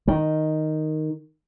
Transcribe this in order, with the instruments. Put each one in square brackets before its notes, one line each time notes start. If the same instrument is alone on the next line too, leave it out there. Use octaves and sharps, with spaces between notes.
[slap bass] D#3